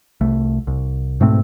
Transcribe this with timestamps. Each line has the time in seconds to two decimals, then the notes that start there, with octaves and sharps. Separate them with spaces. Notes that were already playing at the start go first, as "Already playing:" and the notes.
0.21 C2 A3
0.67 C2
1.21 G#2 B2 A3 C4